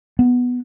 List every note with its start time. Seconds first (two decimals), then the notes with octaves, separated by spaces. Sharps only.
0.19 B3